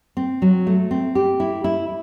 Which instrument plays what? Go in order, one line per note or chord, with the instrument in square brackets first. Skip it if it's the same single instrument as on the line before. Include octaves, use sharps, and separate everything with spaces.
[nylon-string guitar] C4
F#3
A3
C4
G4
E4
E4